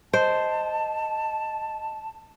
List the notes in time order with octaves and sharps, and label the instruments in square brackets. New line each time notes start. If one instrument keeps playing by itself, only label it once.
[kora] C5 [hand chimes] D#5 [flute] A5